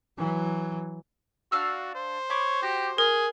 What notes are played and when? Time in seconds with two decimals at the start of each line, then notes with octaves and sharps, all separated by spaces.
0.17 E3 F#3
1.52 D4 F#4 F5 E6
1.95 C5
2.30 C#5 B5 D6
2.63 F#4 G4
2.98 G#4 A#4